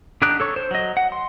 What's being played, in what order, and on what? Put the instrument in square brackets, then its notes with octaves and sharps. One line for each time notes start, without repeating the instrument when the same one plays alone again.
[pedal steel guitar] D3 D4 D#4 G4 F#6
A4 C#5 C#6
C5
F#3 D#5
F#5
C6